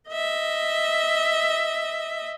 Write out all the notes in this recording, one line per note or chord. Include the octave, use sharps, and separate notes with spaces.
D#5 E5